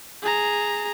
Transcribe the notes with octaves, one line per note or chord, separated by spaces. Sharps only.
G#4 A#5